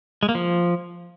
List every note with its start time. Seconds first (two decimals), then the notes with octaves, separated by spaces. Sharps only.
0.23 G#3
0.29 A#3
0.35 F3